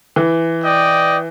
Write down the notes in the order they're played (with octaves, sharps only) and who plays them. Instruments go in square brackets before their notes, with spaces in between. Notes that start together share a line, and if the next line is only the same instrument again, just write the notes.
[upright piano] E3
[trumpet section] D5 D#5 G5